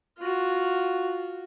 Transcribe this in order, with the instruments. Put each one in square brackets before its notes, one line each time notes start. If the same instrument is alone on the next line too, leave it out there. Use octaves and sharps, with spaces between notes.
[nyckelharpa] F4 F#4